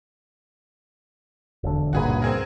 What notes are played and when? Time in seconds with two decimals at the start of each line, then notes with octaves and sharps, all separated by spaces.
1.63 E1 D3
1.93 C#2 G2 A#2 F#4 G#4 B4
2.22 C4 G#4 A#4